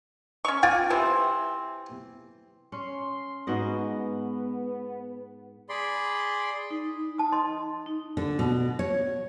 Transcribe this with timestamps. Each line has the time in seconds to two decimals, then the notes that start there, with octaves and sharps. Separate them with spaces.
0.45 C#4 C#6
0.63 F4 G5 G#5 D6
0.90 C3 E3 C4
2.72 C#4 C6
3.47 G#2 B3 F#4 D#5
5.69 G#4 D5 B5 C6
6.70 D#4
7.18 A5 D#6
7.32 D#5 C6
7.86 D#4
8.17 D3
8.39 B2
8.79 C#5